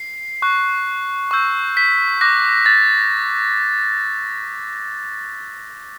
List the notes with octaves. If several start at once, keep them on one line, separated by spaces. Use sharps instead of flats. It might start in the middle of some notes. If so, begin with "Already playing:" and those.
Already playing: C7
C#6 F#6
C#6 E6 G6
B6
D6 F#6 A#6
A6